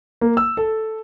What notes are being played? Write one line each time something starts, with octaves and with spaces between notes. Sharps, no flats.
A#3
E6
A4